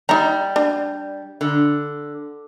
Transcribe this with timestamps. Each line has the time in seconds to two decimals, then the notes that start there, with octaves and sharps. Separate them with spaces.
0.09 G3 D#4 A#5
0.56 D4
1.41 D3